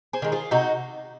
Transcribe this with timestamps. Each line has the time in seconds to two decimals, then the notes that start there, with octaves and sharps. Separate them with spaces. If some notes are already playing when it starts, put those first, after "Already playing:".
0.13 G#4 C5
0.22 D#3 G#3
0.32 F4 G#4
0.51 C3 D#4 F#4